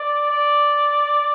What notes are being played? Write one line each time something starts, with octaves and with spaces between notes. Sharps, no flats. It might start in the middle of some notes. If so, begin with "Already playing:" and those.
Already playing: D5
D5